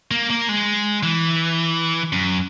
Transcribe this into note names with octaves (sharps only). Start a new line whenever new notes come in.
A#3
A#3
G#3
E3
F#2